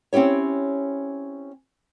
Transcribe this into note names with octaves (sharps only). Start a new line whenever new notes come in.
C4 C#4 E4 G4 C#5